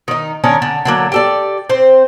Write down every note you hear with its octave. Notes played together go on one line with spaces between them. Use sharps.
D#3 D#4
D#3 C#4 D4 A#4
D3
D3 F#3 A#3
G4 A4 D5
C4 C5